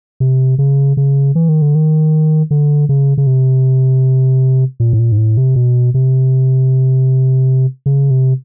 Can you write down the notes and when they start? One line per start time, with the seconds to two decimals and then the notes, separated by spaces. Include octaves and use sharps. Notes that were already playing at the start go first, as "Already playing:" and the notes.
0.20 C3
0.59 C#3
0.97 C#3
1.35 E3
1.49 D#3
1.62 D3
1.75 D#3
2.51 D3
2.89 C#3
3.18 C#3
3.27 C3
4.80 A#2
4.93 A2
4.99 A#2
5.12 G#2
5.18 A2
5.37 C3
5.56 B2
5.94 C3
7.86 C#3
8.10 C3